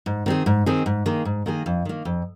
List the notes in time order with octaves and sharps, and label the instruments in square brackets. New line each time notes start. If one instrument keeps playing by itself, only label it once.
[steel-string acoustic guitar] G#2
D#3 C4 G#4
G#2
D#3 C4 G#4
G#2
D#3 A#3 G#4
G#2
D#3 A#3 G#4
F2
D#3 A#3
F2